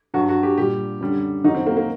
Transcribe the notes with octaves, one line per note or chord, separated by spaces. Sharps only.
G2 F#3 F#4
F#4
G4
A#2 G3 G4
F#2 D3 G3
F#2 D#3 F#3 D#4
C4
A#3
A#3